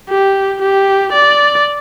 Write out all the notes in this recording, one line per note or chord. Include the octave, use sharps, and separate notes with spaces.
G4
G4
D5